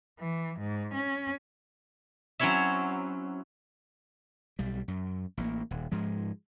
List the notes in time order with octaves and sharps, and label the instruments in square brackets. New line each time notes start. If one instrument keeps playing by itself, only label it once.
[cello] E3
G#2
C#4
[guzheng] F#3 C4 C#4 E4 C#5 E5
[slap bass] B1 G3
F#2
A1 A#3
D#1
G#2 F3 G#3